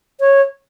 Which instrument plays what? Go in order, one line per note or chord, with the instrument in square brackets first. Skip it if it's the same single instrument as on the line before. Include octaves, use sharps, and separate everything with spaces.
[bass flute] C#5